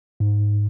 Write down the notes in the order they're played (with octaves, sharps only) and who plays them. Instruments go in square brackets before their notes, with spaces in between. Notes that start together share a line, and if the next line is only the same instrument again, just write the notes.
[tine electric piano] G#2